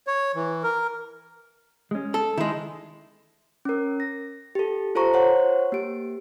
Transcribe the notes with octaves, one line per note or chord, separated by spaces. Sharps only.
C#5
E3
A#4
G#3 C#4
A4
D#3 G#3 E4
C#4 A#4
A#6
G4 A4
F4 A4 C5 A#5 C#6
C5 C#5 F#5 C#6
A#3 G4 D7